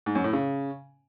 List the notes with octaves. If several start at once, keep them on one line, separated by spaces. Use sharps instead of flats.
G#2
F#2
A2
C#3